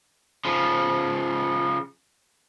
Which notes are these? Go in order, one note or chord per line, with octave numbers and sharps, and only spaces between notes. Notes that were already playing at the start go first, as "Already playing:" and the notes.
C#3 F3